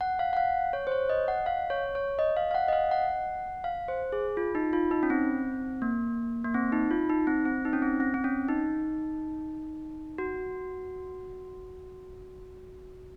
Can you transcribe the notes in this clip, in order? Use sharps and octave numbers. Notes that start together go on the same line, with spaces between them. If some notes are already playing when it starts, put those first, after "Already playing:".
F#5
F5
F#5
F5
C#5
C5
C#5
D#5
F#5
F5
C#5
C#5
D#5
F5
F5
F#5
D#5
F5
F#5
F5
C5
G#4
F4
D#4
F4
D#4
C#4
C4
A#3
A#3
C4
D#4
F4
D#4
C4
C4
D#4
C#4
C4
C4
C4
C#4
D#4
F#4